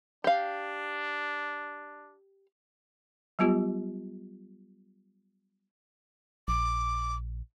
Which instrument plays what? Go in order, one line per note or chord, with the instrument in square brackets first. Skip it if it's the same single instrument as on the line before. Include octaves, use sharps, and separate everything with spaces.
[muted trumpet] D4 [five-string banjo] G4 F5
[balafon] F#3 G3 B3 F4 G4
[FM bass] A#1 [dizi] D6